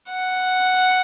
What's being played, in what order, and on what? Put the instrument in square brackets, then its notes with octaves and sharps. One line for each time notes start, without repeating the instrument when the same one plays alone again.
[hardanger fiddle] F#5